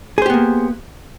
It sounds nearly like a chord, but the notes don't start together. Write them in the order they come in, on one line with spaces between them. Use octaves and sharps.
G#4 C5 G4 B3 A#3